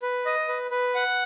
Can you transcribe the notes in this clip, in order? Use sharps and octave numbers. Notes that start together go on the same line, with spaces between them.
B4
D#5
B4
B4
F#5